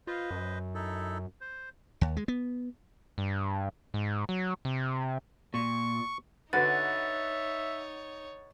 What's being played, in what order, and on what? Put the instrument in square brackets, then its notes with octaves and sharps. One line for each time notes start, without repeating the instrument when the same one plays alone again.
[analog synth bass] F4 [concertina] B4 C5 D#5
[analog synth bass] F#2
[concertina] D#4 E4 A4
C5
[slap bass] D#2
G#3
B3
[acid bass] G2
G#2
F#3
C3
[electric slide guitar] A#2 [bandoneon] C#6
[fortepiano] D3 F#4 B4 [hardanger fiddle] D#4 C#5 [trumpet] E5 [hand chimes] A6